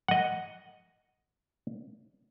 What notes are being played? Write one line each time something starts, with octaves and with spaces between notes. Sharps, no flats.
D#5 F#5